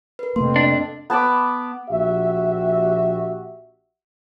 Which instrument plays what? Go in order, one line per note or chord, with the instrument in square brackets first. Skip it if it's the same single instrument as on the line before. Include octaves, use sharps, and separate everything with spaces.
[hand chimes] A#4 B4
[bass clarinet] F2 [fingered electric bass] C3 A3 A#3 [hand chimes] C6
[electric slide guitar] D4 [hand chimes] D#5
[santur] B3 A5 B5 D6
[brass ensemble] A#1 F#4 G4 E5